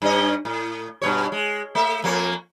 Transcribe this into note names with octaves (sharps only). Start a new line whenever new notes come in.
G2 C#4 D#5
A2
G2 B2 C#5
G#3
A3 E5
F2 A#3 C#5